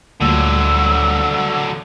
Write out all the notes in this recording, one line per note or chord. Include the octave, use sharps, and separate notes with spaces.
D2 A#2 D3 F#3 G3 E6